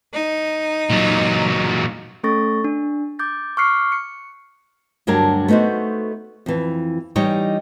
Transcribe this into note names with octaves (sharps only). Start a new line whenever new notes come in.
D#4
A#2 F#3
A3 C#4 A4 C#6 A6 A#6
D4
D6 G6 A6
C#6 D6 F6 F#6 C7 C#7
C#7
D2 G2 F#3 D4 A#4 G#5
A3 B3 D#4 F#4 C5
F2 E3
E3 G3 D#4 G4 C#5 D#5